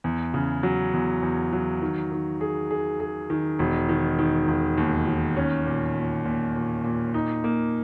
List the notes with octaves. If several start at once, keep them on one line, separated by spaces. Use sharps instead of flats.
E2
C#3
F#3
E2
E2
F#3
D#3
D#3
G#4
G#4
G#4
D#3
E1
D#3
D#3
E1
D#2
D#3
C#4
A#2
A#2
A#2
A#2
A#2
D#4
A#3